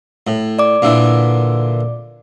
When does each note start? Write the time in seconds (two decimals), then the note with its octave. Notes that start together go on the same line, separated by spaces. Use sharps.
0.27 A2
0.59 D5 D6
0.82 A#2 D3 E3